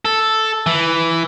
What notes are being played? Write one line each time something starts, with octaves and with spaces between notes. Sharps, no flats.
A4
E3